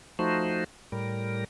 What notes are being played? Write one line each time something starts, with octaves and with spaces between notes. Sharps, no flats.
F3 A3 D#4 F#4 C5
A2 G3 A#4